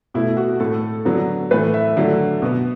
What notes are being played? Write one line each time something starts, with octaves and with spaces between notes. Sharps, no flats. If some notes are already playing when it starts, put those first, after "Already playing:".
B2 A3 E4
F#4
A2 A3 A4
D3 F#3 B3
A2 E3 A3 B4
E5
D3 F#3 A3
B2 B3